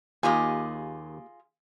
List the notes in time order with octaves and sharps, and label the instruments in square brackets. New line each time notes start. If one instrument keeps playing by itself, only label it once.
[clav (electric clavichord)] D#2 [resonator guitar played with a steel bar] A#3 G4 G#5 [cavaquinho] F4 G#4 D#5